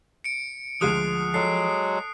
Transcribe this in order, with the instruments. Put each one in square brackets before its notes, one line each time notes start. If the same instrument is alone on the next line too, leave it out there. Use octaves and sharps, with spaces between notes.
[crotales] C#7 D7
[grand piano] D2 G#3 D#7 [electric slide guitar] F3 [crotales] D#6 F#6 C7
[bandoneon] F#3 G#3 [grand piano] A4 [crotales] C7